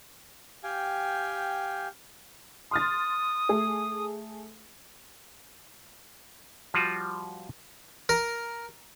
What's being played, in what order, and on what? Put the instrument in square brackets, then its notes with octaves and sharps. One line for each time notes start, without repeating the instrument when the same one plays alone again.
[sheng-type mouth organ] G4 F5 G5 G#5
[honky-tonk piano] C6 F6 A6 [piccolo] D#6
[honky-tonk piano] A3 G#4
[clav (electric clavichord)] F3 G3 F4 F#4
[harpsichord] A#4